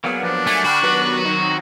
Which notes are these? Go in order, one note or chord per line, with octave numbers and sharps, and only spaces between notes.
F#3 G3 A#3 B3 G#4
F3 B3 D4
A3 G#5
D3 F#4 G5 B5 F6
D#3 F#3 B3 G4 B4 F#6
D#3 F#3 C4 D#4